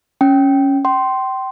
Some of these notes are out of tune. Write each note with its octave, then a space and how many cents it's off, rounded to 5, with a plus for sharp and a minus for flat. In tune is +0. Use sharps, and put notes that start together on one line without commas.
C#4 +0 G5 -10
G5 -30 C6 +0